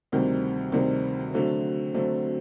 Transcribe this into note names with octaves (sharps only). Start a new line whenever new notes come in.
D2 C3 D#3 G3 C4
D2 C3 D#3 G3 C4
D3 F#3 A3 C4
D3 F#3 A3 C4